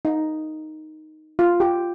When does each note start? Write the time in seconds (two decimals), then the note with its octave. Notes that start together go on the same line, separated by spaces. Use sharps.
0.05 D#4
1.39 F4
1.60 G4